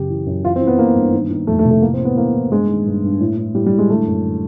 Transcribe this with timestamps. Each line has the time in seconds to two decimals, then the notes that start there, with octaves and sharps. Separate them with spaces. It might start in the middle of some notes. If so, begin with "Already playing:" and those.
Already playing: F#2 C#3 G4
0.09 E3
0.26 F#2
0.44 E3 F4
0.56 C4
0.61 E3
0.67 B3
0.79 E3 A#3
0.95 G2
1.13 D#3
1.30 D#3
1.47 F2 A3
1.59 A3
1.65 C3
1.70 A3
1.82 A2 A#3
1.94 C4
2.00 A2
2.05 B3
2.16 E3 A#3
2.34 E3
2.51 G2 G#3
2.69 D#3
2.86 G2
3.03 G2
3.20 A2
3.37 A2
3.54 A2 G3
3.66 G3
3.73 A2
3.78 G#3
3.89 D3 A3
4.07 F#2
4.24 D3